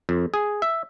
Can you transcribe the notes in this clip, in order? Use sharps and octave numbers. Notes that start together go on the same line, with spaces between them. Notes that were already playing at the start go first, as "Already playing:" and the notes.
F2
G#4
E5